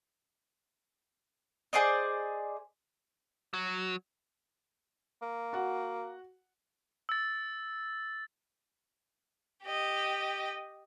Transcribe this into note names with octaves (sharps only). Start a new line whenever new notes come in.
G#4 C5 D5 D#5
F#3
A#3
F#4 F#5
E6 A6
G4 D#5